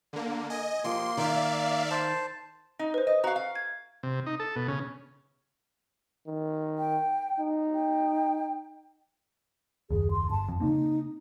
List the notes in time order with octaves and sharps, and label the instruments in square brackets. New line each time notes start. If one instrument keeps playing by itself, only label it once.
[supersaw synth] D3 A#3
[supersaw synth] D#5 [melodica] G#5
[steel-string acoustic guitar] F3 G4 [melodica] A#3 [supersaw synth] C6
[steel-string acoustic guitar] D#3 [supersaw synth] D5 E5 F5
[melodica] C5 A5
[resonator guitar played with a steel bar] D#4
[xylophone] B4 C5
[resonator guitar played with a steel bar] D#5
[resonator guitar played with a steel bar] F#4 F5 [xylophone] A#5
[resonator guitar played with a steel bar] F5
[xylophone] G#6
[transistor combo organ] C3
D#4
A4
B2
C#3
[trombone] D#3
[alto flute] G5
[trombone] D#4
[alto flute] G5
[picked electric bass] F#1 D#2 [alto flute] G#4
[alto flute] C6
[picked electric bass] G1 [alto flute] A5
[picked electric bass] F2
[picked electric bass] C#3 A#3 C4 [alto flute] D#4